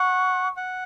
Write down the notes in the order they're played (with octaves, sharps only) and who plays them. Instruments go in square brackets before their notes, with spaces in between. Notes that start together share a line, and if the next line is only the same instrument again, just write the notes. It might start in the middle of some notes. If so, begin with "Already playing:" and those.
Already playing: [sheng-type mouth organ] F#5 [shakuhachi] C#6
[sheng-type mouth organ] F#5